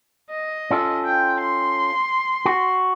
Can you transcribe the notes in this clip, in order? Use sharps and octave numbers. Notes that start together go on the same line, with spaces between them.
D#5
C#4 F4 A4
G5
C6
F#4